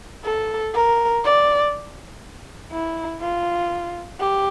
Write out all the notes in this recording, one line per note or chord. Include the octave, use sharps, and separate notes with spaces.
A4
A#4
D5
E4
F4
G4